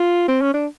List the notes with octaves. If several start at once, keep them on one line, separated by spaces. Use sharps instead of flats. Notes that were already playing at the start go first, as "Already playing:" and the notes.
Already playing: F4
C4
C#4
D4